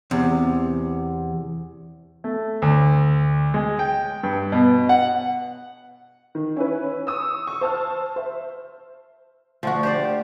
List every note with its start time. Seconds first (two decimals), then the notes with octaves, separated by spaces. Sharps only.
0.11 E2 C3
2.24 A3
2.62 D2
3.54 G#3
3.79 G5
4.23 G2
4.52 B2
4.89 F#5
6.35 D#3
6.57 C#4 E4 B4
7.07 C#6 D#6 E6
7.47 C#6 E6
7.61 C5 A5 E6 F6
8.16 C5 E5
9.63 D2 F3 F4 F#4
9.83 G4 C5 D5